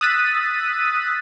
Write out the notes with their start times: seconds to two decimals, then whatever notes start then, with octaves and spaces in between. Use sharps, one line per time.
0.01 D#6 E6 F#6 A6 B6 D#7